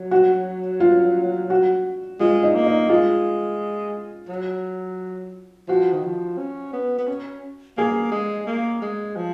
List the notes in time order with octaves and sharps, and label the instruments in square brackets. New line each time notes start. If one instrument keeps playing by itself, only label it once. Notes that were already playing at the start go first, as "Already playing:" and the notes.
Already playing: [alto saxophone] F#3
[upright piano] F#4
F4
F#4
[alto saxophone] G#3 [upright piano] F4
[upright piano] D#4
[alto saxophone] A#3
[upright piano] D#4
[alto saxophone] G#3 [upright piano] F4
[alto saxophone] F#3
[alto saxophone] F3 [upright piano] F#4
[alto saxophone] D#3
F3
C#4
B3
B3
C#4
[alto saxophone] A#3 [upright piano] G#4
[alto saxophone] G#3
A#3
G#3
F3